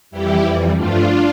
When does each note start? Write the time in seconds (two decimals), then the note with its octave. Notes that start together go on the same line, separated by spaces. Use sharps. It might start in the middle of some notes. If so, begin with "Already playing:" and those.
0.11 F2 E3 G3 E4 G4
0.43 F2 E3 G3
0.75 G2 F3 A3 D4 F4